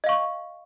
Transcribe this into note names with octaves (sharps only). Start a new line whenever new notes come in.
D#5 F5 C#6